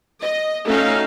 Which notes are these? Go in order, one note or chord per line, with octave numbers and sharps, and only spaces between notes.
D#5
A3 C#4 D#4 F#4 F5